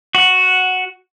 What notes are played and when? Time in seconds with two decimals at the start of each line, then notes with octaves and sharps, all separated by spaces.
0.15 F#4 F#5